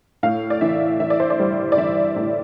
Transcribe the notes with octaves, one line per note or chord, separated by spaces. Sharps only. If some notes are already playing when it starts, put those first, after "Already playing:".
A2 F5
D5
E3 E5
E3 E5
D5
C5
D5
G3
D5
E3 E5
A2